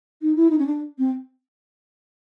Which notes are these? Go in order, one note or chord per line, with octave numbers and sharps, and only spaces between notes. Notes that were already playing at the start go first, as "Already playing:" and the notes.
D#4
E4
D#4
C#4
D4
C4